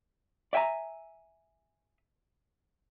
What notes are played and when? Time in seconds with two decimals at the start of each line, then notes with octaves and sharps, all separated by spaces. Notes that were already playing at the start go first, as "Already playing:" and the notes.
0.53 D5 E5 G5 G#5 A#5